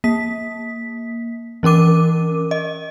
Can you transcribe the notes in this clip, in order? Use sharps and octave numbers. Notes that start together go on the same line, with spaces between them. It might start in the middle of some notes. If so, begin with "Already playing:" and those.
A#3 B6
E3 C#4 A#4 D6 D#7
D#5